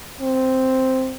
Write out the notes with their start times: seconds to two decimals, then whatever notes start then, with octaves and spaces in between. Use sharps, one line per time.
0.21 C4